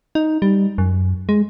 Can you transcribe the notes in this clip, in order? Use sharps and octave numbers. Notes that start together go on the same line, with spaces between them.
D#4
G3
F#2
G#3